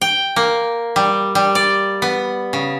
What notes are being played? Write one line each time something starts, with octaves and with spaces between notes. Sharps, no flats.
G5
A#3
G3
G3
D5
B3
C#3